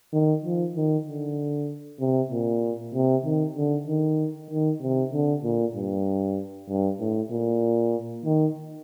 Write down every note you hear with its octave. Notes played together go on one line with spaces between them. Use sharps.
D#3
F3
D#3
D3
C3
A#2
C3
D#3
D3
D#3
D#3
C3
D3
A#2
G2
G2
A2
A#2
D#3